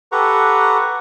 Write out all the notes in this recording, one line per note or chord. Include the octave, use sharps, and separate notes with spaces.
G4 A4 B4 F#5 A#5 C#6